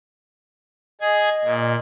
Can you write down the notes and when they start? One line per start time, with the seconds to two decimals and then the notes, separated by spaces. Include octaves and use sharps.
1.01 G#4 D#5 G#5
1.44 A#2